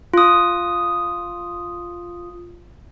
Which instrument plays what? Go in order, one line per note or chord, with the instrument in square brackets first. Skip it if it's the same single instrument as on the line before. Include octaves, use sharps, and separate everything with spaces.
[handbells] F4 D#6